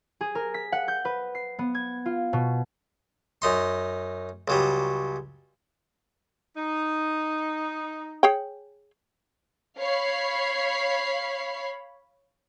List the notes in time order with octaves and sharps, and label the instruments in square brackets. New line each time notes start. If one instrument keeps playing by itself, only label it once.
[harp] G#4
A#4
B6
F#5
G6
B4
C7
B3
G#6
F4
B2
[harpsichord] F#2 D#4 C6
C#2 F#3 G3
[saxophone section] D#4
[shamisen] G#4 C#5 G5
[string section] C#5 F5 B5 C7